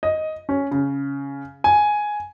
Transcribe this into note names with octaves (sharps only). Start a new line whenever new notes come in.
D#5
C#4
C#3
G#5